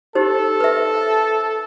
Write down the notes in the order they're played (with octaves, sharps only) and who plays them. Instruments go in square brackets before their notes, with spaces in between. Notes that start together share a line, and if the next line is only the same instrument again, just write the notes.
[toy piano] D#4 G4 C5 [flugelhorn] A4
[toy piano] B4 E5